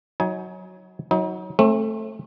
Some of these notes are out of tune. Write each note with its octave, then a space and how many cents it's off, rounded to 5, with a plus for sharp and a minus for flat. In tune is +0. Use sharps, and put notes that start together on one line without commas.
F#3 +0 D#4 +30 G#5 +20
F#3 +0 D#4 +35
A3 +0 C4 +40